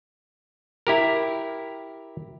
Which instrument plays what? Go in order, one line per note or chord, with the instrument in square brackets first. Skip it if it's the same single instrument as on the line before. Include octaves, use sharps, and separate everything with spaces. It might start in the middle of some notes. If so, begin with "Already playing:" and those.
[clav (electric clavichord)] E4 G4 A#4